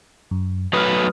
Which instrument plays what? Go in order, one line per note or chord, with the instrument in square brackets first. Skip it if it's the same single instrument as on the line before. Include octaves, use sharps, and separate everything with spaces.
[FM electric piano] F#2
[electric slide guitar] F#3 A3 B4 [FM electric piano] D#6 F6